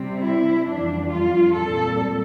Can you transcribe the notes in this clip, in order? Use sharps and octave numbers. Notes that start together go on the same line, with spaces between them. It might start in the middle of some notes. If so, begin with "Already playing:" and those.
Already playing: C3 G3 C4
E4
F2 E3 G3 D4
F4
A#2 G3 C4 A4